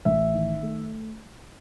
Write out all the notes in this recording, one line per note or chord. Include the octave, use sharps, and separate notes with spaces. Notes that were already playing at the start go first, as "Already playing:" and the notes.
A1 E5
D#3
A3